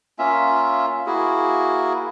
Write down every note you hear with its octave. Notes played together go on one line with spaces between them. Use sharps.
A#3 C#4 F4 E5
A#3 E4 F#4 G#4